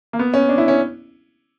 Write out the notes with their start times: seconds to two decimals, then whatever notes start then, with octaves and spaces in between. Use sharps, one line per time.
0.13 A#3
0.19 B3
0.34 C#4
0.49 D4
0.58 E4
0.68 C#4